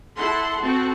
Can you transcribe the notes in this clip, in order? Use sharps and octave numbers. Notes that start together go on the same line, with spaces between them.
E4 A4 F#5 C6
C4 F#4 A4